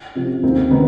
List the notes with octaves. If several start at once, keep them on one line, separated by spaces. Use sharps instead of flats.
C3 F3
D#2 C4
D#3 B3